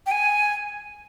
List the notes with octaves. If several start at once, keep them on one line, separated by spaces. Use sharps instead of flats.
G5
G#5